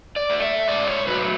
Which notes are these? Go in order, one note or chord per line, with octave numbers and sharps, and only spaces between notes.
D5
A3
E5
G#2 D5
C#5
F#3 A3 B4